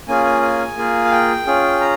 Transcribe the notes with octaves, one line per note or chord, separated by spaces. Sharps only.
A#3 C#4 F4 G#4 G#5
G#5
G#5
A#3 F4 G#4
F5
G5
C#4 F4 G#4
A#5